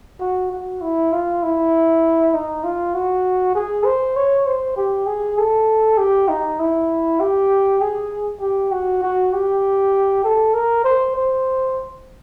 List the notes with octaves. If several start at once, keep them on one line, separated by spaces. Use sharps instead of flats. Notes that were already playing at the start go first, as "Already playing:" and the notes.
F#4
F#4
E4
F4
E4
D#4
F4
F#4
G#4
C5
C#5
C5
G4
G#4
A4
G4
D#4
E4
G4
G#4
G4
F#4
F#4
G4
A4
A#4
C5
C5